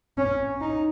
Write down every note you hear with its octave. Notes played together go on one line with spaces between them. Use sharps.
C#4
D#4